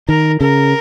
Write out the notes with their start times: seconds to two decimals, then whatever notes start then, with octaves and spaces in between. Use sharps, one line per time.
0.09 D#3 A#4
0.41 C#3 A#4